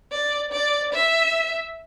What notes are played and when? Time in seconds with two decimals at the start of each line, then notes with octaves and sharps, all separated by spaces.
0.12 D5
0.52 D5
0.93 E5